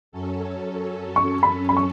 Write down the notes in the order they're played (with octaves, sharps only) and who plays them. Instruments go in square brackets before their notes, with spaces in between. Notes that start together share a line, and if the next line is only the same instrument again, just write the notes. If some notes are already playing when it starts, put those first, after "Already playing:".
[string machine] F#2 F#3 C#4 A4
[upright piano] C#6
B5
B5
C#6